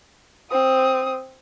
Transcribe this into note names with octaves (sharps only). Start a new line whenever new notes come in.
C4 D#6